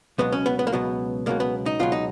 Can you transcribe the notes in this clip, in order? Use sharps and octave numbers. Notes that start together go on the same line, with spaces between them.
C#2 B2 F#3 B3
C#4
B3
B3
A#3
C#2 B2 F#3 B3
C#2 B2 F#3 A#3
B3
D#4
C#2 B2 F#3 F4
D#4